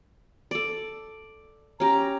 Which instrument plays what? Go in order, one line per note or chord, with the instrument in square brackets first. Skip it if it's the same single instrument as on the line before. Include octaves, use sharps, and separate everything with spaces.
[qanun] A4 D5
[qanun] C#4 G4 [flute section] A#5